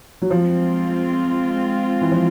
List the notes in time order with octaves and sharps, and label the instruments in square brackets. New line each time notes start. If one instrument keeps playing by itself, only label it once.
[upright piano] F#3
[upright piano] F3 [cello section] G#3 C4 F4
[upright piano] E3
F3